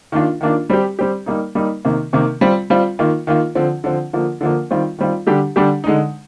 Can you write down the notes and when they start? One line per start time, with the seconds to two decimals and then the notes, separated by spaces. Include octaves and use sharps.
0.12 D#3 A#3 D4 F4
0.41 D#3 A#3 D4 F4
0.70 G3 C4 G4
0.99 G3 C4 G4
1.26 G3 A#3 D#4
1.55 G3 A#3 D#4
1.85 C3 D#3 A#3
2.13 C3 D#3 A#3
2.41 G3 C4 F4
2.70 G3 C4 F4
2.99 D#3 A#3 F4
3.27 D#3 A#3 F4
3.55 D3 F3 C4
3.84 D3 F3 C4
4.13 D3 F3 A#3
4.41 D3 F3 A#3
4.70 D#3 G3 C4 F4
4.99 D#3 G3 C4 F4
5.27 D3 G3 D4 G4
5.56 D3 G3 D4 G4
5.84 D3 G#3 D#4